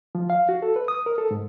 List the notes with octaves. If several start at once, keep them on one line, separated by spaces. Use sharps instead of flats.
F3
F5
F#4
A4
B4
D#6
A#4
A4
G#2